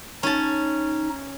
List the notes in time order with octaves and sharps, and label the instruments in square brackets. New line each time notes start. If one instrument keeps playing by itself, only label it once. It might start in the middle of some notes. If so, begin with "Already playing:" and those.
[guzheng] C#4 A5 [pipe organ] D#4